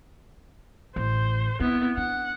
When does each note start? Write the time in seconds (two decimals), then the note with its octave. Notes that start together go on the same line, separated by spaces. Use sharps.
0.96 A1 C5
1.60 B3 C4 E4
1.97 D4 F#5